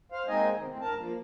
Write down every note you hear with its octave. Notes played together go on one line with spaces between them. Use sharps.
C5 F5
G#3 A#3 C4 D#4 D#5 G#5
C3 D#3
A2 C4
G2 A#4 A5
F3 A#3